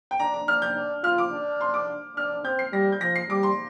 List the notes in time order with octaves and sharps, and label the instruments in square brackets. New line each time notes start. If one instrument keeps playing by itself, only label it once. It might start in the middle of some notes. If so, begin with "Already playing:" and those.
[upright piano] G5
[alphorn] D4 [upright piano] A#5
[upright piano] A#5
[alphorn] D4 [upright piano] F6
[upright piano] G6
[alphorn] D4
[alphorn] F4 [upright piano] F6
[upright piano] D6
[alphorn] D4
[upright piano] C6
D6
[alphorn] D4 [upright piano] F6
[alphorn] C4 [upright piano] G6
[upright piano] C7
[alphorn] G3 [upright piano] A#6
[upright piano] G6
[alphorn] F3 [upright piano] A#6
[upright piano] C7
[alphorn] G3 [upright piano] D6
[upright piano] C6